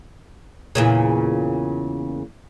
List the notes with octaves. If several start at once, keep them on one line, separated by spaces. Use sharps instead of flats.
E2 A#2 C#3